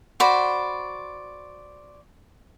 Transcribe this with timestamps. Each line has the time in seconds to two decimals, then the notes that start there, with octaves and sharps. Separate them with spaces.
0.20 F#4 C5 D5 B5